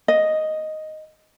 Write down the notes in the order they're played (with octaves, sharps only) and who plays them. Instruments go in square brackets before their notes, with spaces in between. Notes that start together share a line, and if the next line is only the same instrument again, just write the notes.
[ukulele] D#5